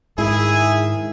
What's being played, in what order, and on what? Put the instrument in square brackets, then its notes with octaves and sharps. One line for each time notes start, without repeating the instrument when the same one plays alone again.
[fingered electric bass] G#2 [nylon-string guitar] D#3 E4 [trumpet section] G#4 E5 G#5